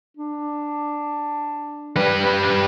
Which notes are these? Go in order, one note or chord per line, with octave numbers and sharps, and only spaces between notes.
D4
G3 B4